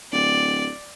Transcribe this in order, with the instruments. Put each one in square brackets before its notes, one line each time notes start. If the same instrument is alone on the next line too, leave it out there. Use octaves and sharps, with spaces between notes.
[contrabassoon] D1 [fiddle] D5